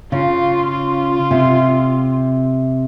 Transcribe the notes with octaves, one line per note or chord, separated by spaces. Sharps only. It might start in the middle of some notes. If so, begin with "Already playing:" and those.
C#3 F4
F4
C3